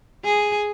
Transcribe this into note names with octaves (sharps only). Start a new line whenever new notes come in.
G#4